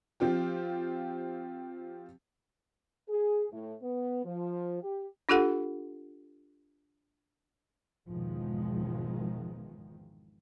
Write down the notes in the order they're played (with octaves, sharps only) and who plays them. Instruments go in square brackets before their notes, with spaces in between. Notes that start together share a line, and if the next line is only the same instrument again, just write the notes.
[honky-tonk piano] F3 C4 F4 G4
[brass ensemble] G#4
A2
B3
F3
G4
[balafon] D4 F4 G4 A4 F#5
[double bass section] G#1 E2 B2 D#3 F3 G#3